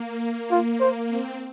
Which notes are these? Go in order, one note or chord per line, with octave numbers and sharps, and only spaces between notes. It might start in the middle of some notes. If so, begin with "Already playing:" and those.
Already playing: A#3
F4
C5
C4